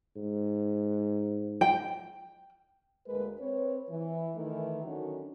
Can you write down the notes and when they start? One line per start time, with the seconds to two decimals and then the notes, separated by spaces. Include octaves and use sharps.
0.16 G#2
1.61 G5
3.07 D2 G#3 A#3 A#4 B4
3.40 C4 B4 C#5
3.90 E3
4.35 D#3 E3 A3
4.84 D3 D#3 F#3 C#4 D4 F#4